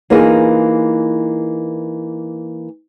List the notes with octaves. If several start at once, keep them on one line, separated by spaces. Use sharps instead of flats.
E3 A#3 D#4 F4 G#4